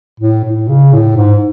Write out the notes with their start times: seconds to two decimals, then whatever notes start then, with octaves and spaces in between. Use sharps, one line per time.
0.20 A2
0.44 A2
0.69 C#3
0.93 A2
1.17 G#2